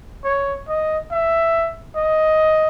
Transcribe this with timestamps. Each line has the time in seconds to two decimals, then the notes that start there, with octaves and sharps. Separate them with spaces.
0.24 C#5
0.68 D#5
1.11 E5
1.96 D#5